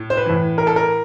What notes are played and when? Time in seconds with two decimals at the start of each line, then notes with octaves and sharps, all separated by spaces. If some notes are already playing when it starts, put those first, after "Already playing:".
Already playing: A2
0.10 C5
0.17 B4
0.25 A2 E3
0.58 A#4
0.67 A4
0.76 A#4